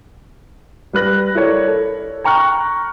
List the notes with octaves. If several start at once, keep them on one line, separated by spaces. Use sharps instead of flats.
G3 B4 F#6 A#6
E4 A4 A#4 C#5 D5
A4
G5 A#5 C#6 F6 F#6